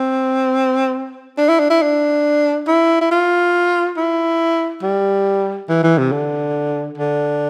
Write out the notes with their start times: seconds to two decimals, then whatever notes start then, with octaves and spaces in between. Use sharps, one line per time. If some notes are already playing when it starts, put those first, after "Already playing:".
Already playing: C4
1.38 D4
1.49 E4
1.59 D4
1.70 E4
1.82 D4
2.68 E4
3.01 E4
3.11 F4
3.97 E4
4.82 G3
5.69 E3
5.83 E3
5.98 C3
6.12 D3
6.98 D3